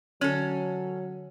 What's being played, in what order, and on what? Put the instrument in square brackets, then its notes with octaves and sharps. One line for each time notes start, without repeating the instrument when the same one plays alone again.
[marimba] D3 [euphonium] F#3 [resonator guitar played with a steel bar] C#4 A4